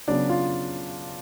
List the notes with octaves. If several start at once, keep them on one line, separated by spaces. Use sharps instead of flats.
C#3 F#3 B3 D4 D5
F4 F5